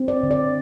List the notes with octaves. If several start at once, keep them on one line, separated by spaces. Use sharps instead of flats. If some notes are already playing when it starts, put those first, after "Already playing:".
Already playing: C4
D5
D3
D5